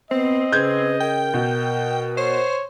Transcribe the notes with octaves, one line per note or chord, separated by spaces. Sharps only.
B3 C4 D#5
C#3 B4 G6 G#6
A#4 G5
B2
C5 C#5